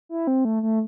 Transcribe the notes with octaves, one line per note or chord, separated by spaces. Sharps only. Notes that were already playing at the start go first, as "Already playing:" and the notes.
E4
C4
A3
A3